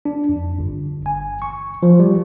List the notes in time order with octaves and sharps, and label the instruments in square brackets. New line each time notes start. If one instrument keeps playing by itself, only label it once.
[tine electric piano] D4
F2
G1
G#5
C#6
F3
G3